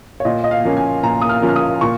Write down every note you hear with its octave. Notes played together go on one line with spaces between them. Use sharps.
C#5
A#2 D#5
D#5
F5
F3 A#3 C#4
G#5
A#2 A#5
D#6
F6
F3 A#3 C#4
F6
D#6
A#2 C#6